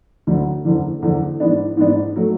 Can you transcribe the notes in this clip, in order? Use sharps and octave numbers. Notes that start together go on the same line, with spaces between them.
D2 D3 F#3
F#1 E2 D3
F#1 E2 D3
G#2 E3 B3 D4
G#2 E3 B3 D4
F#3 A3